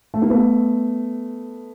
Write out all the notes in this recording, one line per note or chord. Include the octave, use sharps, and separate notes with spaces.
A3
A#3
A3 B3